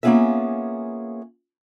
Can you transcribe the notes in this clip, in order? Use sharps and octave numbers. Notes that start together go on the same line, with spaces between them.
A#3 B3 C#4 F4 G#4 E5